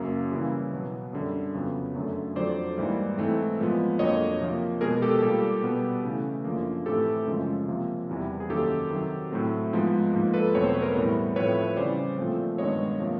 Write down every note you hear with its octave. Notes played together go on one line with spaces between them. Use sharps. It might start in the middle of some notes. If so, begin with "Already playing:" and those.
Already playing: F#2 C#3 F#3 A#3
C#3 E3 G3 A#3
B2 F#3 B3
F#2 D3 G3
F2 C#3 F#3 B3
F#2 D3 F#3 A3
F2 D3 F#3 C5 D5
G#2 E3 G3 A#3
G#2 E3 A3 C4
A#2 F3 G#3 B3
F2 D3 F#3 A#3 C#5 D#5
C3 F3 A#3
B2 G#3 B3 G#4 A#4
G4 A4
A#2 G3 A#3 G4 A4
B2 G3 B3
C#3 E3 A3
F#2 D3 F3 A#3
A2 E3 A3 C4 G4 A4
F#2 C#3 F3 G#3
C3 F3 A#3
E2 C3 E3 G3
G#4
F#2 D#3 F#3 A#3 G4 A4
C3 D#3 F#3
A2 F#3 A3 C4
G#2 F3 G#3 B3
G#2 F3 A#3
A4 B4
E2 B2 F#3 A3 C4 C#5
C5
B4
A#4 C5
A2 E3 G3 B3
A2 F3 A3 C4 B4 C#5
C#3 E3 G3 C5 D5
A#2 F3 A3 C4
G2 D#3 G#3 B3 C#5 D#5
C3 F3 A#3